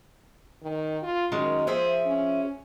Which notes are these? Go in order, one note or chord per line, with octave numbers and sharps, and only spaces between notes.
D#3
F4
F#2 D#3 G#3 C#4
F3 G#4 C5 E5
C#4